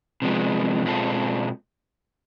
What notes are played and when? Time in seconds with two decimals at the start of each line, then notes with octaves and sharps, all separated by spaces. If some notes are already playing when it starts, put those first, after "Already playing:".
0.22 C3 F3 G#3 B3
0.85 B2 G#3 C4 F4 A4